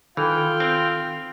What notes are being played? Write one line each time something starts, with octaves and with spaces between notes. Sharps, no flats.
D#3 E3 F4 A4 G5 F6
C4